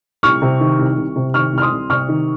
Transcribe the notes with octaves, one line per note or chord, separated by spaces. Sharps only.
C2 C#6 F6
C3
D#3
C2
C2
C3
D#3 C#6 F6
C2 F6
C6 D#6
C2
C3 C#6 F6
D#3